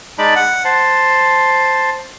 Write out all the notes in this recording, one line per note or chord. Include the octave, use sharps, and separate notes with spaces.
G#3 D#4 D5 A5 B5
F#5
C5 A5